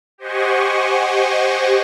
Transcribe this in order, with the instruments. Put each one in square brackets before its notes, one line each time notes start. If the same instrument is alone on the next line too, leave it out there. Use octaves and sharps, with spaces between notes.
[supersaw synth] G4 C5 D#5 F#5 G#5 C#6